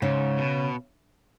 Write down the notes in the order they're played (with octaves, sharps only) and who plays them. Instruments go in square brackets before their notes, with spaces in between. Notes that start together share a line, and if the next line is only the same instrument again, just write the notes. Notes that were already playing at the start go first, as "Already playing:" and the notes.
[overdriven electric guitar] G#2 [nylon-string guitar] C#3
[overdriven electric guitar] B2